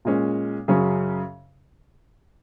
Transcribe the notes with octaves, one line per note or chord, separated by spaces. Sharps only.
A#2 G#3 C#4
F#2 C#3 F#3 C#4 G#4